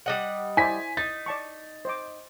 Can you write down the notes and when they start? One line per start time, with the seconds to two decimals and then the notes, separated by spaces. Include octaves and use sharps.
0.06 G3 D#5 F#5
0.57 E4 C5 D5 G#5 B6
0.97 D#4 A6
1.26 D5 A5 C#6
1.85 C5 D#5 D6